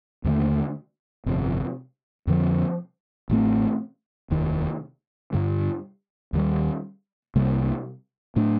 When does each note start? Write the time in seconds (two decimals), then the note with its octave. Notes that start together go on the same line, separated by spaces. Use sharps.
0.24 D#2 D3 F3 A3
1.26 G1 F2 C3
2.27 F2 D3 F3 C4
3.30 A1 A2 A3 C4
4.30 F1 D#2 D#3
5.33 G2 D3 G3
6.33 D#2 D#3 G3
7.36 C2 C3 G3 A#3
8.36 A2 A3 D4